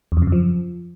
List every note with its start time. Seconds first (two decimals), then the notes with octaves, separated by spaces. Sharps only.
0.12 E2
0.17 F2
0.22 C#3
0.27 F#2
0.32 F3